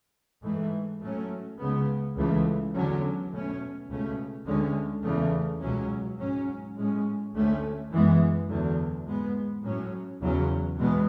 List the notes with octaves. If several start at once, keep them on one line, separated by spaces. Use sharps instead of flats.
G#2 E3 A3
A2 F#3 A3 C#4
C#2 C#3 G#3 B3
C#2 C#3 E3 A3
E2 D3 F#3 C#4
B2 A3 C#4
C#2 B2 A3 C#4
D2 D3 G#3 C#4
E2 C#3 E3 A3
C#2 B2 F#3 C#4
G#2 F#3 C#4
A2 G#3 C#4
D2 D3 A3 C#4
F#2 E3 G#3 B3
E2 D3 F#3
G#2 G#3 B3
A2 F#3 C#4
E2 C#3 F#3 C#4
E2 B2 G#3 B3